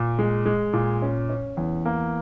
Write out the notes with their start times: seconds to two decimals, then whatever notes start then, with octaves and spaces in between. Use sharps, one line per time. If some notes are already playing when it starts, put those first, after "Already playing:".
Already playing: A#2
0.19 G#3
0.46 G#3
0.73 A#2
1.02 C#4
1.29 C#4
1.57 E2
1.85 A#3